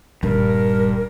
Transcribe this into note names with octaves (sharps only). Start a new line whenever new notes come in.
D#1 G2 A#4